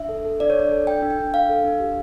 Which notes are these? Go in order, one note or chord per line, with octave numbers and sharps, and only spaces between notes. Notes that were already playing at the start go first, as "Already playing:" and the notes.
Already playing: D4 E5
A4
A4
D4 D5
C#5
D4 D5
A4
A4 G5
D4
G5
D4
A4 F5
A4
D4
G4